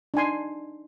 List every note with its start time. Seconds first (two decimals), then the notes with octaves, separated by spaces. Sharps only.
0.14 D4 D#4 G#5 C6